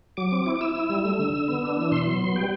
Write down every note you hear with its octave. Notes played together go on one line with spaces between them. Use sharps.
F#3 D6
C4
E4
D6
E4 E6
E4
G3
A3
D3
D3
B3
D4
E3
B2 C6
F#3
B3
G3 G5